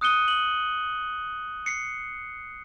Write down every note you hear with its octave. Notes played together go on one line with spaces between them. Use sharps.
D#6 F#6 C#7 D#7 G7
F#7
C7 C#7